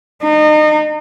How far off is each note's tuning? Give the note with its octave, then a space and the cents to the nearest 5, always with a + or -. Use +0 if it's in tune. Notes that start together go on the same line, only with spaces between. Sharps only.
D#4 -30